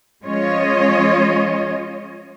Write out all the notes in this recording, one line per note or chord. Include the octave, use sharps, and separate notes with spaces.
F3 G#3 C#4 F4 C#5 D#5